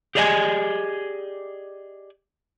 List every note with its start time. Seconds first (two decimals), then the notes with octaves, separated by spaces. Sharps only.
0.15 G4 G#4 D5 D#5 F#5 G#5